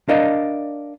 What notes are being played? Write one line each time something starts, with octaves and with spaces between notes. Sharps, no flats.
D4 A#4 D5 D#5 F5